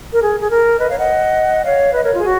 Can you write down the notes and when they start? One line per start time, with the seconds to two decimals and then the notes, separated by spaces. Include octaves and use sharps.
0.13 A#4
0.22 G#4
0.40 G#4
0.51 A#4
0.79 B4 D#5
0.89 C#5 F5
0.99 D#5 F#5
1.66 C#5 F5
1.94 B4 D#5
2.04 A#4 C#5
2.14 F4 G#4
2.23 F#4